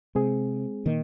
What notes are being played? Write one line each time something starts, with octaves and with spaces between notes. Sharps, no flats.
C3 G#3 C4 G#4
A#2 D#3 A#3 D#4